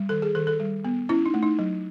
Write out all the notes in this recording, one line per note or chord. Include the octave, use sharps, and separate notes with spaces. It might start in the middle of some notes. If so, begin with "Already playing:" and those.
Already playing: G3
D#3 A4
G#4
D#3 A4
A4
G3
B3
C#4 E4
D#4
A3
D#4
F#3